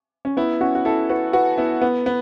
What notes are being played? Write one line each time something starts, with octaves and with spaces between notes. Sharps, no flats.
C#4
B3 E4
C#4 F#4
F#4
E4 A4
F#4 B4
F#4 B4
B3 E4
B3
B3